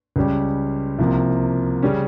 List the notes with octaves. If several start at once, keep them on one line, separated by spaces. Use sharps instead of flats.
C#2 C#3 G3 C#4 G4
C2 C3 F3 A#3
C#3 G3 C#4